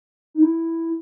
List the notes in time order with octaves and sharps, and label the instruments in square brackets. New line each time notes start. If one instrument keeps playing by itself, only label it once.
[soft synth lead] D#4
E4